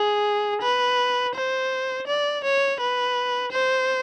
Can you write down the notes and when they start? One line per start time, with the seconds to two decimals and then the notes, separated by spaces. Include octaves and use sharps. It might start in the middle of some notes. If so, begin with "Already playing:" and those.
Already playing: G#4
0.62 B4
1.35 C5
2.07 D5
2.44 C#5
2.80 B4
3.52 C5